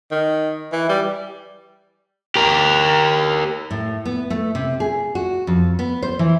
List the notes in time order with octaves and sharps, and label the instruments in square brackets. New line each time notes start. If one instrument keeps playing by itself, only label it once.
[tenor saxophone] D#3
E3
G3
[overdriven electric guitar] G4 A#4
[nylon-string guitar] A2
B3
A3
C3
G#4
F#4
F2
B3
C5
E3